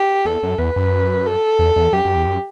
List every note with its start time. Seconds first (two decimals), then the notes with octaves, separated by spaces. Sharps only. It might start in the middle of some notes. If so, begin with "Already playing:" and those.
Already playing: G4
0.25 E2 A4
0.43 F#2
0.58 E2 B4
0.76 F#2
1.26 A4
1.59 E2
1.76 E2
1.93 F#2 G4
2.05 F#2
2.15 E2
2.26 F#2